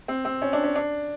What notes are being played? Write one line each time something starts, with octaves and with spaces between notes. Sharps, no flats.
C4
C4
C#4
D4
C#4
D4